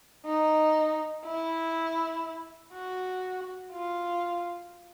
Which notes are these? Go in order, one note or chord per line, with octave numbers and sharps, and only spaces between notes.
D#4
E4
F#4
F4